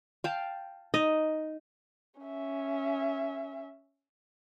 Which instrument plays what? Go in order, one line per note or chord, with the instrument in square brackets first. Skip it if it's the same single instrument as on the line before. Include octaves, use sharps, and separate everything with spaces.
[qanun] F5 G5 A5
[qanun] D#4 [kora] D#5
[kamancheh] C#4 E5